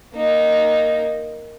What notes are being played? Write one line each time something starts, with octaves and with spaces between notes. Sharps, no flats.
A#3 D#4